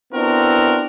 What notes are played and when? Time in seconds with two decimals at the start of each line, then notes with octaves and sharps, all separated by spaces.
0.13 B3 C4 D4 E4 F#4 A#4